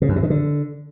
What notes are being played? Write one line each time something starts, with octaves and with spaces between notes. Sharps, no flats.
C#3
F#2
B2
D#3
D3